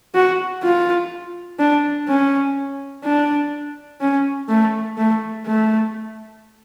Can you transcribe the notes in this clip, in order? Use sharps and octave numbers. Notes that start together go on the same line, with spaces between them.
F#4
F4
D4
C#4
D4
C#4
A3
A3
A3